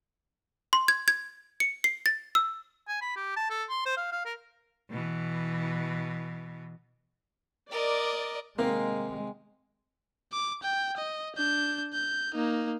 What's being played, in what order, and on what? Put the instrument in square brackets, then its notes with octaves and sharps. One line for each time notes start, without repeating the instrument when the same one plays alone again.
[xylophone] C6
G#6
G#6
C#7
C7
A6
E6
[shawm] G#5
B5
G4
A5
A4
C6
C5
F5
F5
A#4
[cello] B2 E3
[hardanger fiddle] A#4 D#5 [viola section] D5
[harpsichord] C3 D#3 [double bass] G#3 [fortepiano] A#3
[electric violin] D6
G5
D#5
D4 G6
G6
A#3 D#4